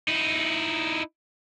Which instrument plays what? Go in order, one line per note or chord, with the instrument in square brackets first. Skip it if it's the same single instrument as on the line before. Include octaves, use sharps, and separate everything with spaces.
[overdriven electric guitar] D#4 E4